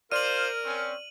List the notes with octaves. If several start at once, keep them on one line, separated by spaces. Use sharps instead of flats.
F4 A#4 C5 D5 F6 D#7 F#7
C4 C#4